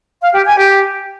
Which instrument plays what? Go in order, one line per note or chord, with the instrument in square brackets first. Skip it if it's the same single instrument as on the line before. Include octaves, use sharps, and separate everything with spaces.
[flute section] F5
G4
G#5
G4